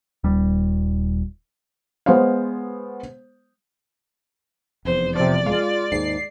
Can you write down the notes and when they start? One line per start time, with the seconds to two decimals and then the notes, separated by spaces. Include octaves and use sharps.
0.24 D#1 G3
2.06 G#3 B3 C5 C#5 F5
4.85 F1 E2 C5
5.15 C3 F3 D5
5.46 G#3 F4
5.92 D#2 G#2 C7